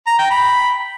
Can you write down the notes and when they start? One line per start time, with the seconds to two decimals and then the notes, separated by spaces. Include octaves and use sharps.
0.07 A#5
0.19 G5
0.31 B5